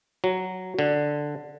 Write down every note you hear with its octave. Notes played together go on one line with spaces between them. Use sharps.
F#3
D3